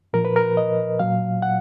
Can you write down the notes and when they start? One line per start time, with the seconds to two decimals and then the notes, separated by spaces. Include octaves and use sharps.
0.13 A#2 F3 A#4
0.25 B4
0.36 A#4
0.57 D#5
0.99 A#2 F#3 F5
1.42 F#5